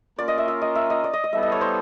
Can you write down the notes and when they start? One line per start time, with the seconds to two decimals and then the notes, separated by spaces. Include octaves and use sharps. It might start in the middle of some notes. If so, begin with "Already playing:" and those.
0.18 A#3 C#4 F4 A#4 D5
0.28 D#5
0.38 E5
0.48 E5
0.62 D#5
0.75 E5
0.90 D#5
1.04 D5
1.13 D#5
1.24 D#5
1.33 G3 B3 E4 A4 E5
1.43 D#5
1.52 C#5
1.61 C5